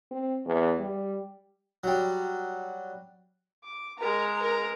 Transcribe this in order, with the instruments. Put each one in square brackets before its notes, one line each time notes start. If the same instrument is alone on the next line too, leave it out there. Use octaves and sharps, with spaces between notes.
[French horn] C4
E2
G3
[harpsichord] F#3 G3
[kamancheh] D6
[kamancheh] G#3 A#5 [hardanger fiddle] A#4
[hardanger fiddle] A#4